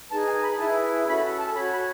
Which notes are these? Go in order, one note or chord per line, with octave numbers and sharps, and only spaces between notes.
D#4 G#4 B4 A5
G#5
B5
E4 G#4 B4 A5
G#5
C#4 F#4 A4 B5
A5
F#4 C#5 B5
B5